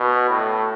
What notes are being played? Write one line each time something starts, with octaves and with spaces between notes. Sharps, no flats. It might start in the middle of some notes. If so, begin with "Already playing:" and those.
Already playing: B2
A2